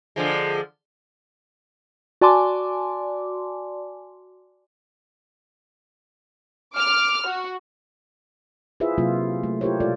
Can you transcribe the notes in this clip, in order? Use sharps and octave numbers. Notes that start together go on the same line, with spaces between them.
D3 F3 G#3
F#4 D5 G#5 A5 C6 D6
D6 F6
F#4
E4 F4 G#4 B4 C5 E5
C3 F#3 A#3 E4 F4
A3
E4 F4 G4 A#4 C5 C#5
B2 G#3 F4 A4 D5